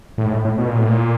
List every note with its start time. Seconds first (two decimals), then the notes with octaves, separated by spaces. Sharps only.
0.18 A2
0.25 G#2
0.31 A2
0.45 A2
0.58 B2
0.68 A#2
0.78 A2
0.88 A#2